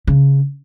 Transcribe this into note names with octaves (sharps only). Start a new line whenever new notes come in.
C#3